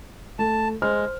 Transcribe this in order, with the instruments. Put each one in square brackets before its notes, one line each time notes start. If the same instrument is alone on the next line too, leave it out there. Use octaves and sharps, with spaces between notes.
[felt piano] A3 [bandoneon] A5
[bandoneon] G#3 [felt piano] C5 F6